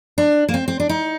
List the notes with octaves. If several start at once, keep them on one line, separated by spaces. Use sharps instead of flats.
D4
A#3
C4
C4
D4
D#4